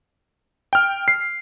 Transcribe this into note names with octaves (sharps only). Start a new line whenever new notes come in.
G5 F6
C7